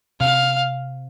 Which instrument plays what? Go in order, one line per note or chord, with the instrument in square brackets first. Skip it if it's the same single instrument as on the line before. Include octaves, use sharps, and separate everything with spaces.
[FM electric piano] C3 [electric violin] F5